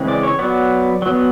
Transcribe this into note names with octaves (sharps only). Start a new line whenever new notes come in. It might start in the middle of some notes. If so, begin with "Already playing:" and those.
Already playing: C#3 E3 G#3 C4
D5
C#5
F#3 B3 D5
F#3 B3